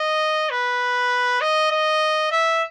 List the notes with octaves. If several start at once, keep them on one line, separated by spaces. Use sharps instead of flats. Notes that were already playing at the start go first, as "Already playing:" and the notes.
Already playing: D#5
B4
D#5
D#5
E5